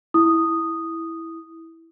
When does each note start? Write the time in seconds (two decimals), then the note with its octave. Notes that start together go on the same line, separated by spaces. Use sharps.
0.14 E4 D#6